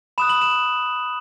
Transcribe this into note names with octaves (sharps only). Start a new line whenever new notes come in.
B5 D#6 F#6 E7
F#7
E7